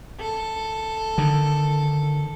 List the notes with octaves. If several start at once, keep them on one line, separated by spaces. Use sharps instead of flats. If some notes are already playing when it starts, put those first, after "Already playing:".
A4
D3 D#3